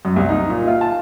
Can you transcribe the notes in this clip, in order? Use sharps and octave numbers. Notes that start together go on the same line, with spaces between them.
F#2
C2
D#4
A#2
F4
A5